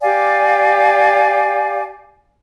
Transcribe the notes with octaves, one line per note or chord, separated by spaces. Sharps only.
G4 D5 F5 G#5